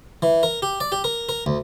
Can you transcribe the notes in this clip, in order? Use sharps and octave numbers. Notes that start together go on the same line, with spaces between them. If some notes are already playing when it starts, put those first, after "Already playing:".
E3
A#4
G4
D5
G4
A#4
A#4
D2